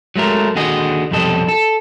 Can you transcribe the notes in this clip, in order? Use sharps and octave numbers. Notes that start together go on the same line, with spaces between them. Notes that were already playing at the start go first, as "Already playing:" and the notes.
F#3 G#3 A3 A#4
D#2 D3 F#4 G#4 D#5
B1 F2 C3 G3 A4 D#5
A4